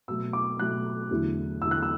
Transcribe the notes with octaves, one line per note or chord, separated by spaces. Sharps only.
B2 F#3 A3 E6
D6
B2 F#3 A3 F#6
E2 D3 F#3 A3
E2 D3 F#3 A3 E6
F#6
E6